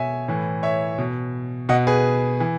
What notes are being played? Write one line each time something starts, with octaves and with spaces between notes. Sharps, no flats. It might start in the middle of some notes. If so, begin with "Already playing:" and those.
Already playing: B2 C#5 E5 G#5
A2 E3
C#5 E5
B2
B2 D#5 F#5
G#4 B4
E3